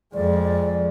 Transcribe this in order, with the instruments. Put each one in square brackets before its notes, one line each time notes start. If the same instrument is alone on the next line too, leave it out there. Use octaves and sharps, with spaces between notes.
[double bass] F2 G#3 [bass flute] D5